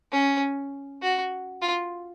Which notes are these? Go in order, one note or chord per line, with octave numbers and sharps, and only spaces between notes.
C#4
F#4
F4